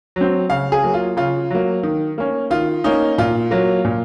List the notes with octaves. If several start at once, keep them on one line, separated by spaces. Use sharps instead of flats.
F#3 C4
C#3 F5
G#4
F#3 A#3
F4
C#3 F4
F#3 A#3
D#3
A#3 C#4
D#3 F4
A#3 C#4 D#4
A#2 F4
F#3 A#3
A#2